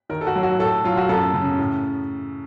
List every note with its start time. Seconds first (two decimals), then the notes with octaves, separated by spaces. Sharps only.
0.09 D#3 A#4
0.21 A4
0.27 F#4
0.35 F#3
0.43 F#4
0.59 A2 A4
0.84 F#3 F4
0.97 F#4
1.09 F#2 A4
1.34 C#3
1.59 A2